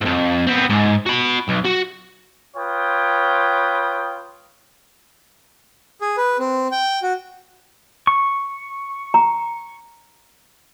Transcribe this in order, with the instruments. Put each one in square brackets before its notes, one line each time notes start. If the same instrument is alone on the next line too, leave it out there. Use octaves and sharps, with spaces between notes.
[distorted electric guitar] F2 G#2
B3 C4
G#2
F#4 B5
B1
F#4
[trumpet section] F4 B4 C#5 G5 D#6
[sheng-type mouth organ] G#4
B4
C4
G5
F#4
[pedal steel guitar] C#6
[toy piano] A#5